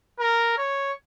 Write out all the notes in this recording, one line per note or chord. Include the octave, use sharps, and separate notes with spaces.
A#4
C#5